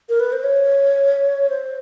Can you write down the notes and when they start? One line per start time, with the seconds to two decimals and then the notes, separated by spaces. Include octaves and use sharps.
0.09 A#4
0.20 B4
0.32 C5
0.44 C#5
1.49 C5